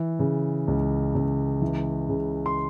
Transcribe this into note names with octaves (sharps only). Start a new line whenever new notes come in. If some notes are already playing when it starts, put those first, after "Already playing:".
Already playing: E3
C#3
C#2
C#2
E3
C#3
C6